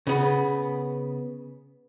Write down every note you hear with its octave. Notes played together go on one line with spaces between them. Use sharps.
C#3 B3